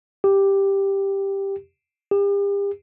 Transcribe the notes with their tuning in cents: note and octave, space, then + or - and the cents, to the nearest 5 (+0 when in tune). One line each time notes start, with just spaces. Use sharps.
G4 +5
G4 +40